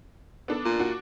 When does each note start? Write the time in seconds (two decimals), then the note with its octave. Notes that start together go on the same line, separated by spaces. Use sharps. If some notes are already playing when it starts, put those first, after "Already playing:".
0.48 B3 D4 A4
0.65 A#2
0.80 D4 F#4